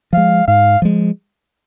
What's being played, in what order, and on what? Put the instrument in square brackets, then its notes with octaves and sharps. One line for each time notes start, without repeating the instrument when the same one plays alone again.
[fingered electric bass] F3 G#3 [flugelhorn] F5
[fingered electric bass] G#2 [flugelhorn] F5
[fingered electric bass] F3 G#3